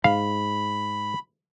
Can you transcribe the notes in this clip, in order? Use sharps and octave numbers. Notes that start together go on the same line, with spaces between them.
G#2 F5 B5